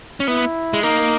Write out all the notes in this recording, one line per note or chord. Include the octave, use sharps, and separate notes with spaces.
C#4
B3 E4
G#3
A#3 D#4